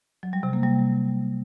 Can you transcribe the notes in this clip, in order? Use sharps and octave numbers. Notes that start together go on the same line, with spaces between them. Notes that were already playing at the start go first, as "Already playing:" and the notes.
F#3
G3
C3
A#3
G3